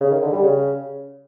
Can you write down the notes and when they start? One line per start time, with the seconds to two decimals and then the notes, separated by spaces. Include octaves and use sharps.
0.01 C#3
0.11 D#3
0.22 D3
0.33 G3
0.43 C#3